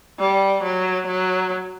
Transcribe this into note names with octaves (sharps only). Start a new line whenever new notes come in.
G3
F#3
F#3